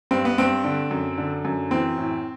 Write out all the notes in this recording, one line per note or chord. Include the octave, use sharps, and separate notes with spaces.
G2 C4
B3
G2 C4
D3
F#2
D3
F#2
E3 C4
A2